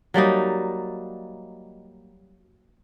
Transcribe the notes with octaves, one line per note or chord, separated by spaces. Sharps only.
F#3 G3 A#3 D#4